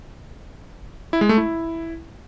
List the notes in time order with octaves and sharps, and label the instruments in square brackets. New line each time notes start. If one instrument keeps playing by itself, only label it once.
[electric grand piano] E4
G#3
A3
E4